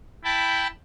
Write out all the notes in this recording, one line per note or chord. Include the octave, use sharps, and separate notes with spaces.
E4 G5 A5 B5